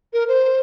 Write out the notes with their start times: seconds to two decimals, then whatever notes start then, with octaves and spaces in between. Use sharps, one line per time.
0.13 A#4
0.29 C5